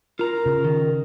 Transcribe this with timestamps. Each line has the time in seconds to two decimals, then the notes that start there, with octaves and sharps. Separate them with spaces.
0.19 F4 A#4 A#5
0.46 C#3
0.64 D#3